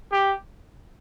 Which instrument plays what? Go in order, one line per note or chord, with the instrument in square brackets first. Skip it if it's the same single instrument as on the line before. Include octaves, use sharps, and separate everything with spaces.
[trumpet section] G4